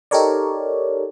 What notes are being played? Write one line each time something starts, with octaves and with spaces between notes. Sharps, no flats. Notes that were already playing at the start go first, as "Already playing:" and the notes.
D#4 G4 A4 A#4 C#5 D5